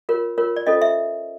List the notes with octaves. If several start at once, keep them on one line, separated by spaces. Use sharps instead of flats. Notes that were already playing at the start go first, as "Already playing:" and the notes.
F4 A#4 C#5
F4 A#4 C#5
D5
C#4 F4 A4 C5 D#5
E5